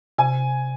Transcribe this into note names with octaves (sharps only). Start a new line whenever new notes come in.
C3 G#5